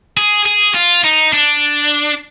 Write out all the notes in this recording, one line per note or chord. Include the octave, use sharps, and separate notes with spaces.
G#4
G#4
F4
D#4
D4